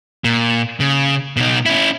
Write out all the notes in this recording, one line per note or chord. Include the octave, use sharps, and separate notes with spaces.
A#2
C#3
B2 D#4
C#4 E4